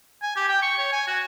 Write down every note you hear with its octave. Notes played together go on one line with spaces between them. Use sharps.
G#5
G4
G5
C#6
C#5
G#5
F#4